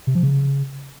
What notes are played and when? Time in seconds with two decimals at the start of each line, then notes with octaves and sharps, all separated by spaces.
0.07 C3
0.15 F3
0.23 C#3